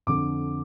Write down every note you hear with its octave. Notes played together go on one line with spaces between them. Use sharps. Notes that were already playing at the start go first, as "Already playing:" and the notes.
F2 D3 D6